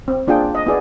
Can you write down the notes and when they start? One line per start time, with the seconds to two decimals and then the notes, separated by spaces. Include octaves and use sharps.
0.08 C4
0.27 A#3 D4 F4 G#4 G5
0.55 D#5
0.66 B3 E4 G#4 D5